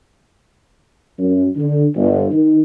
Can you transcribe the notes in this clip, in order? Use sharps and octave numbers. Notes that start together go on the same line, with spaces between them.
F#2
D3
G1
D#3